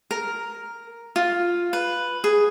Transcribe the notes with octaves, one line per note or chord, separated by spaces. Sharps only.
A#4
F4
B4
G#4